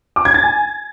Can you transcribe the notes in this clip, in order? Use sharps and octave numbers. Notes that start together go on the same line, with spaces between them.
D6
G#6
A6
G#5